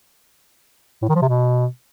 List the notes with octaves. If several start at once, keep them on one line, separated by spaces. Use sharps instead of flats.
A2
D#3
F3
C3
B2